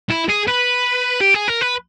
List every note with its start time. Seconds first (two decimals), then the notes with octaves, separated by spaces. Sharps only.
0.11 E4
0.29 G#4
0.48 B4
1.21 G4
1.34 G#4
1.48 A#4
1.61 B4